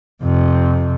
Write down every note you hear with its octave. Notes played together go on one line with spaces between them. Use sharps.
F2 C3